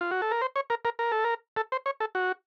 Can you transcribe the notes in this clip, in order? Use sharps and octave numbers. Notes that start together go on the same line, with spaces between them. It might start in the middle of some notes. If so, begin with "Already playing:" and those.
F4
F#4
A4
A#4
C5
C#5
A#4
A#4
A#4
A4
A#4
A4
C5
C#5
A4
F#4